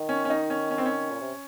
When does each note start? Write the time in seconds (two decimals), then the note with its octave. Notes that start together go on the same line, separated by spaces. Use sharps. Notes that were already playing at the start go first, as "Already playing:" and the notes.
Already playing: D#3
0.09 C#4
0.25 C#4
0.30 D#4
0.50 C#4
0.71 C#4
0.78 C4
0.85 C#4
1.11 A#2
1.21 C3